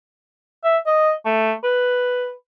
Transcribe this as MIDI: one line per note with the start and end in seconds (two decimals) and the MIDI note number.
0.64 0.77 76
0.86 1.12 75
1.25 1.54 57
1.63 2.32 71